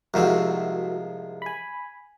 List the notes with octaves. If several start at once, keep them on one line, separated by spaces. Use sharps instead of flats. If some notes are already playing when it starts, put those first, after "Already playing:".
C2 G#2 F3 F#4 A#4 E5
G#5 B5